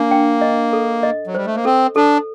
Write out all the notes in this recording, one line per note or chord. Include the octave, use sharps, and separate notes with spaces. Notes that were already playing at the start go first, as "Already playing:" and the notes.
Already playing: A#3 D4
G5
D#5
A4
D#5
F#3
G3 C5
A3
A#3
C4 A4
D4 A4